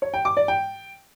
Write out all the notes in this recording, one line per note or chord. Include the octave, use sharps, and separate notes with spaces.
C#5
G5
D6
D5
G5